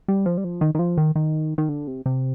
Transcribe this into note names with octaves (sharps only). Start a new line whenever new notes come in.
G3
F3
G3
F3
D#3
D#3
F3
D#3
D#3
D#3
D3
C3
C3